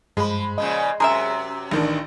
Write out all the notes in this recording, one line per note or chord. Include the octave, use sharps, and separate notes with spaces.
G2 F3 G#3 B5
A#2 C#3 F3 D#5
F#2 C3 G#4 A#4 E5 A#5 C6
A1 D#3 D4